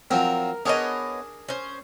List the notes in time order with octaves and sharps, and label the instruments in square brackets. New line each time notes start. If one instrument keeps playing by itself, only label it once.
[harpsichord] F3 F#3 C4 [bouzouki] A#4
[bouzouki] B3 C#5 D#5 [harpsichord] D4 G#4 A#4
[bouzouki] C#4 C5